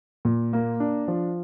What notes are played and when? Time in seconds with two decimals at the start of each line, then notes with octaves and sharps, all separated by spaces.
0.25 A#2
0.53 A#3
0.80 D4
1.08 F3